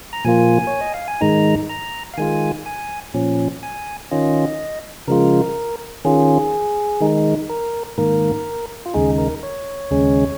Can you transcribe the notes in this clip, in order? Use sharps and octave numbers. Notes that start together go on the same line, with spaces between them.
A#5
A#2 F3 A#3 F4 G#5
C#5
D#5
F5
G#5
G#2 D#3 G#3 D#4 A#5
A#5
F5
D#3 G#3 F4 G#5
G#5
A#2 F3 C#4
G#5
D#3 C#4 F4 D#5
C#3 F3 G#3 F4 A#4
D#3 C#4 F4 G#4
D#3 G#3 D#4
A#4
G#2 D#3 A#3 A#4
F4
D#2 C#3 G#3 D#4 G#4
A#4
C#5
D#2 C#3 G#3 C#4